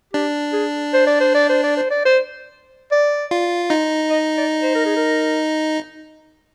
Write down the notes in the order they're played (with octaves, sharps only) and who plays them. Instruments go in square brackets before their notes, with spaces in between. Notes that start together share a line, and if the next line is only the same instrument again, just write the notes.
[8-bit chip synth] D4 [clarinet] G4
[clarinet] G#4
C5
D5
C5
D5
C5
D5
C5
D5
C5
D5
[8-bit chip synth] F4
D#4
[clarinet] D#5
D5
C5
A#4
G#4
A#4